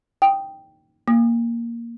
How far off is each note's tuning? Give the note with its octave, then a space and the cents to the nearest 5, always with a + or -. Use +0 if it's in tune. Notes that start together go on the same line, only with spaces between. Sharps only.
G5 +0 D#6 +0
A#3 +0 D#6 -40